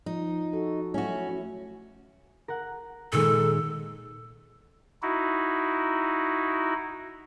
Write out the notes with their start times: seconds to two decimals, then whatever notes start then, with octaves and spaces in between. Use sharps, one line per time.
0.06 F3 D#4
0.53 F#4 A4
0.94 F#3 A3 C#4 E4 F#4
2.48 A#4 F#5
3.12 A#2 D#3 G#3 A4
5.02 D#4 E4 F#4